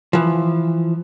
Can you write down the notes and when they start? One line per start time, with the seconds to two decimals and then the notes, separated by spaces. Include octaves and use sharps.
0.13 E3 F3